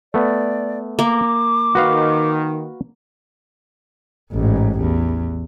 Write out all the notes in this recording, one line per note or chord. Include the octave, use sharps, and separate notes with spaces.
A3 B3 D5
A#3 D6
D#3 F#4 B4 F5
A1 G#2
E2